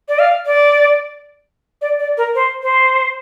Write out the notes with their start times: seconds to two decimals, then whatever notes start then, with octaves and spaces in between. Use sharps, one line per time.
0.08 D5
0.19 F5
0.46 D5
1.82 D5
1.99 D5
2.17 A#4
2.35 C5
2.63 C5